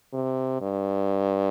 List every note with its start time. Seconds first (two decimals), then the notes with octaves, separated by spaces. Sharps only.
0.14 C3
0.61 G2